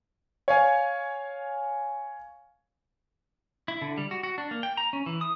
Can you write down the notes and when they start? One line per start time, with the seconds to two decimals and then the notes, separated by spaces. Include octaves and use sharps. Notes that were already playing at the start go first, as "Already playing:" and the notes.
0.48 C#5 F5 G#5
3.68 E4
3.82 D3
3.98 G3
4.11 F#4
4.23 F#4
4.38 D4
4.51 A#3
4.63 G5
4.77 A#5
4.93 C#4
5.06 E3
5.21 D#6